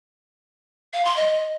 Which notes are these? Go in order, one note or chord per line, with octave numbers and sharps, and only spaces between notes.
F5
C6
D#5